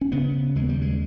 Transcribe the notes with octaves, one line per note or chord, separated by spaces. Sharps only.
C#4
C#3 B3
D#2 G#3
G3
G#3